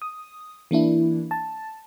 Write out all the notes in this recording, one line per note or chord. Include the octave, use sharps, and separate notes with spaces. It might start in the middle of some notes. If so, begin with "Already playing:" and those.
D#6
E3 A#3 D4 E4
A5